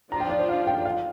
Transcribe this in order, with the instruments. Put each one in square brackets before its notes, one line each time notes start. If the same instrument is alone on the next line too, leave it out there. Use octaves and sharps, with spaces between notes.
[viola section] F3 D4 F4 [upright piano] A#5
[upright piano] G5
D5
C5
F5
G5
F5